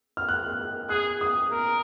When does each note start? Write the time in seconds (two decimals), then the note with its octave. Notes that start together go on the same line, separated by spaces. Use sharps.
0.17 F6
0.29 F#6
0.89 G#4 F#6
1.21 D#6
1.52 A#4